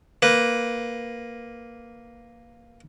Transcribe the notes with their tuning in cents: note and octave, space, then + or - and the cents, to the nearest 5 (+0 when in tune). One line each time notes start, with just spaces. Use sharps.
A#3 +0 B4 +0